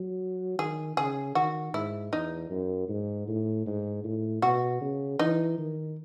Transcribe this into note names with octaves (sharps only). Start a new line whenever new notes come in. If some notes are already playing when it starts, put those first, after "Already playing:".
Already playing: F#3
D#3 G#4
C#3 G#4
D#3 F#4
G#2 E4
E2 D#4
F#2
G#2
A2
G#2
A2
B2 F#4
C#3
E3 D#4
D#3